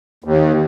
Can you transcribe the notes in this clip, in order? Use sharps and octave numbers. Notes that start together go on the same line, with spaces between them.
D#2